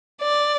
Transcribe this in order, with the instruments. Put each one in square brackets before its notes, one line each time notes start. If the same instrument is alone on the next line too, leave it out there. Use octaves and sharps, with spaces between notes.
[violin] D5